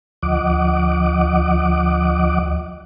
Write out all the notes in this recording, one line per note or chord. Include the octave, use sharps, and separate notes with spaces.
D2 F3 D#5 F#5 D6